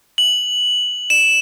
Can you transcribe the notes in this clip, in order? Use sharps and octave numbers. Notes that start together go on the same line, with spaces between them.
F#7
E7